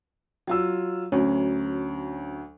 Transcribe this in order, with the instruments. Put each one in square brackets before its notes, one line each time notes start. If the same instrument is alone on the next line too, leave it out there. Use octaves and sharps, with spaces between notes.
[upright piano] F#3 F4 E6
[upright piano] D2 F#3 [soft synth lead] C#4